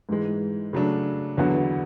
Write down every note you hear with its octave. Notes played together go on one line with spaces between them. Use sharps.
G#2 E3 G#3
C#3 F#3 A3 D4
E2 D3 F#3 B3 F#4